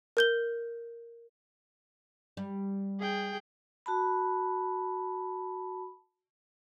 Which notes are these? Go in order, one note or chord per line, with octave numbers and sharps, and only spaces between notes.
A#4 G6 G7
G3
G#4 G5
F#4 A5 B5